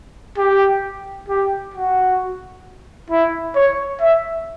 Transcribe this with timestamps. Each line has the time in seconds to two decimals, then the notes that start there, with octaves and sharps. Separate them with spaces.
0.38 G4
1.28 G4
1.74 F#4
3.10 E4
3.55 C#5
4.01 E5